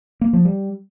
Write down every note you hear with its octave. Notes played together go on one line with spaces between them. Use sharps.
A#3
F3
G3